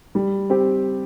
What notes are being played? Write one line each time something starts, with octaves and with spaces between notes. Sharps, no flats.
G3
C4 G4